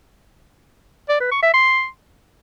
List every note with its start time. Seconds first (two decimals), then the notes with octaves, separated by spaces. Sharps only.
1.09 D5
1.20 B4
1.31 C#6
1.43 E5
1.54 C6